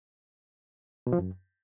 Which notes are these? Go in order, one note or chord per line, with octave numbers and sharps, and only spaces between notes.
B2
F3
F#2